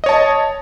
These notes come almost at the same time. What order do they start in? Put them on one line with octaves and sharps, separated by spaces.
D#5 C#5 A5